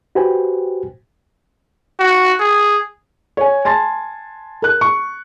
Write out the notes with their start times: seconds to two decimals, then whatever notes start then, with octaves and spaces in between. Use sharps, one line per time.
0.15 F#4 G4 B4 C5 G5 G#5
2.00 F#4
2.40 G#4
3.37 C#5 G#5
3.65 G#5 A5 C6 A6
4.62 A#4 F#6
4.81 C#6